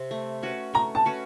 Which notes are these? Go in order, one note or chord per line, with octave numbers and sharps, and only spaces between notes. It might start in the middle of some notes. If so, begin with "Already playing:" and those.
Already playing: C3 C4
A3
C#4 F#4 B4
A3 A#5
A5
C#4 F#4 B4